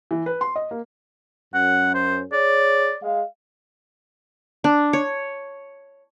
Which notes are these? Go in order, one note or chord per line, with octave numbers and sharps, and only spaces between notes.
E3
B4
C6
D#5
A#3
F#2 C#4 F#5
C5
G#4 C#5 D5
G#3 F5
D4
C#5